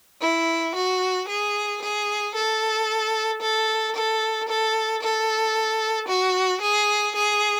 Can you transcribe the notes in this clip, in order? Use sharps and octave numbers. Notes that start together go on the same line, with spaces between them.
E4
F#4
G#4
G#4
A4
A4
A4
A4
A4
F#4
G#4
G#4